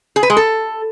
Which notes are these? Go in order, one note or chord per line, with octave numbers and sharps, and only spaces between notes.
G#4
B4
G#3
A4